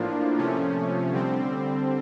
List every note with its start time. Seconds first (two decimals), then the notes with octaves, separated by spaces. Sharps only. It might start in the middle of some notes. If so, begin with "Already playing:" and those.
Already playing: A2 F3 A#3 D4 F4
0.38 C3 F3 A3 C#4
1.12 D3 G3 C4